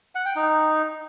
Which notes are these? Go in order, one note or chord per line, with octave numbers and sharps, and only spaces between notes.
F#5
G5
D#4